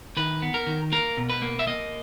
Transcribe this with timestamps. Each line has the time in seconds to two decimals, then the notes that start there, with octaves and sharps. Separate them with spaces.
0.17 D#3 B4
0.42 B3
0.54 A#4
0.67 D#3
0.92 A#3 A#4
1.17 B2
1.29 B4
1.42 A#3
1.59 E5
1.67 A#3 D#5